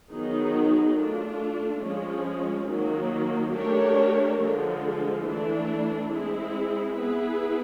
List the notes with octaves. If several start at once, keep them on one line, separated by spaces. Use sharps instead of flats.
D#3 F#3 B3 D#4 G#4
A3 D4 F4
F3 G#3 C#4
D#3 F#3 A#3
A3 D4 G4 A#4 C#5
D3 F3 G#3
E3 A3 D4
G#3 C4 E4 G#4
B3 E4 G#4 B4